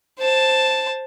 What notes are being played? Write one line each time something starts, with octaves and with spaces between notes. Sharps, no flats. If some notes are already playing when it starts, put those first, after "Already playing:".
C5 A5